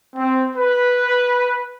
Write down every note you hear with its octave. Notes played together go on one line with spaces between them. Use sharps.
C4
B4